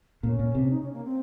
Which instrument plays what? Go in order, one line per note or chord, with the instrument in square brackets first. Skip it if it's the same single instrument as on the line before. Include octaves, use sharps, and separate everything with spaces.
[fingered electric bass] A#2 [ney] C#4
[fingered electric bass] A#2
C3
[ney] C#4
D#4
C#4
A#3
C4